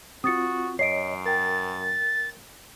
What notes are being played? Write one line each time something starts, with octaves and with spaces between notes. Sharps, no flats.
C4 F4 F#4 D#6 A6 C#7
F#2 C#5 D#5 C7 D7
A#4 G5 A6